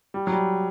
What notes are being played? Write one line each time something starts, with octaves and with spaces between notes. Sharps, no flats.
G3
F#3
G3